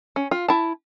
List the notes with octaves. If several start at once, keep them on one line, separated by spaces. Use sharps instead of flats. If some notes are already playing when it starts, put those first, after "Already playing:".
C#4
F4
E4 A5